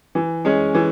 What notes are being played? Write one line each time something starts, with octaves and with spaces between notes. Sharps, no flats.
E3
G#3 C#4
E3